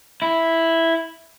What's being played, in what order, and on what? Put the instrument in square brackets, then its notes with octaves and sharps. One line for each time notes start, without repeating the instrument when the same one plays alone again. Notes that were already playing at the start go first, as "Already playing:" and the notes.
[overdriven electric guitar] E4